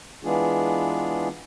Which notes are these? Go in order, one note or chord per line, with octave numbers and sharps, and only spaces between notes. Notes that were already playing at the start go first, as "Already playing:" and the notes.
E3 G#3 B3 D4 F4 G#4